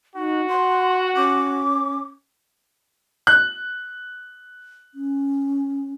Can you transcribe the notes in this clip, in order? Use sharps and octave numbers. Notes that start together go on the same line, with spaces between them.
D#4 F#4
F#5 C6
C#4 D6
F#6
C#4